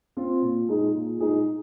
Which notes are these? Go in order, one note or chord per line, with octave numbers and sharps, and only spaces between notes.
C4 F4
A#2
G#3 D#4 G#4
A#2
G#3 D#4 G#4